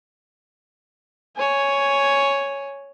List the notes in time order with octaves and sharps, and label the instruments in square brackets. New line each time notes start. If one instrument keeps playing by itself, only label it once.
[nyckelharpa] C#5 G#5